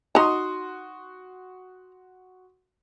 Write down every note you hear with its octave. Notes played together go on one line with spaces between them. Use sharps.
D#4 F#4 A#5 C6 D#6